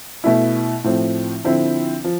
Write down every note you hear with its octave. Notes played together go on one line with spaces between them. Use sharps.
B2 A3 E4
A2 F3 C4
D3 F3 C4 E4
F3